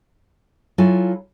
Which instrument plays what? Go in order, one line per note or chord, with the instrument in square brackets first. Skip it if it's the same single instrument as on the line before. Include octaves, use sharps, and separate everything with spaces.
[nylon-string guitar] F#3 E4 F4 A4 F5 G#5